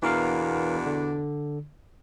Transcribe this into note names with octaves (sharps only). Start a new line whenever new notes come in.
E2 B2 E3 D4 A#4 F5
D3